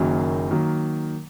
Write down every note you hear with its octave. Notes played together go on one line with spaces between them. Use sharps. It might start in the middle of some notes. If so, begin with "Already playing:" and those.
Already playing: F#1 F#2 D#3 F#3 A#3
D#3 F#3 A#3